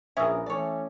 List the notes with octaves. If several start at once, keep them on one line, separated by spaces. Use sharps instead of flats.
A#1 C#4 G#4 A#4 B4 E5 D#6 E6
E3 A3 C#4 C#5 D5